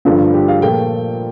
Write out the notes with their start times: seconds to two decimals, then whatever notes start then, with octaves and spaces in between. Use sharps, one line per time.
0.05 G2 D3 F3 A3 F4
0.34 G4
0.48 F5
0.62 A#2 F3 A3 G5